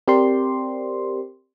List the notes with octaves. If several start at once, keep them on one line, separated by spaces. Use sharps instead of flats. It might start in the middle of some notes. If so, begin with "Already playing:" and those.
C4 G4 A#4 C5 D5 C6